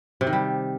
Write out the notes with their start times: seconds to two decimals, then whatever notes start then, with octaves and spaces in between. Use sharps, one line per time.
0.21 C3
0.27 D#3
0.33 G3